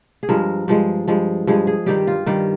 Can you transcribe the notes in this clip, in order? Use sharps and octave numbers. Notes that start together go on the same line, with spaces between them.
G#4
G2 F3 G#3 A#4
G2 F3 G#3
G2 F3 G#3
G2 F3 G#3 G#4
G#4
G2 D#3 G3 G4
F4
G2 D#3 G3